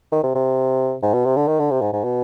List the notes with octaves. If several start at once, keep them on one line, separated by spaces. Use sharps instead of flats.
D#3
C3
C3
G#2
B2
C3
D3
D#3
D3
C3
G#2
G#2
B2